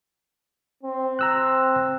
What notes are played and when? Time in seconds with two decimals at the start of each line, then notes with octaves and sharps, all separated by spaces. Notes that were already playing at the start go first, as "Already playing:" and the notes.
0.83 C4
1.19 A#5 E6 F#6